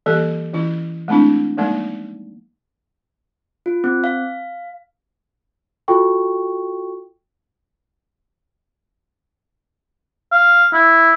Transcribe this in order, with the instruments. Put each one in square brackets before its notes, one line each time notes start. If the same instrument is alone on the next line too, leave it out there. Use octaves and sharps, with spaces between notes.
[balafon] E3 G3 A#3 G4 A4
E3 C#4 E4
G#3 A3 C4 D4 E4
F3 G3 G#3 A#3 D#4
[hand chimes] F4
C4
F5
[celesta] F4 F#4 A4 G5 C#6
[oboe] F5
E4